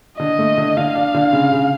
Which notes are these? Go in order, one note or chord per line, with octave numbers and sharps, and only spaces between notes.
D3 D#5
A3
D3
D3 F5
D4
D3
C#3
C#3